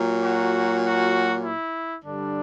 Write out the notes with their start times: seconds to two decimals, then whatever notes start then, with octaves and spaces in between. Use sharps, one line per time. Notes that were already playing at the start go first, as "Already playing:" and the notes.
Already playing: A#2 F#3
0.23 F#4
0.83 F#4
1.42 E4
2.03 G2 D3 G3 D4